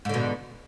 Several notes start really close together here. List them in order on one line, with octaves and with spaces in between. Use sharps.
G#2 D3 B2